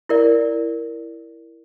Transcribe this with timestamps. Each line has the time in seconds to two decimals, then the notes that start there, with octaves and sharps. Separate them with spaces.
0.09 E4 A#4 D5